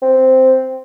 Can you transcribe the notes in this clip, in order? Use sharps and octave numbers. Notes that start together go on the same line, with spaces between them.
C4